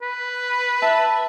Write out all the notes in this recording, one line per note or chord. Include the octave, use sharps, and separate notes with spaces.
B4
E5 A5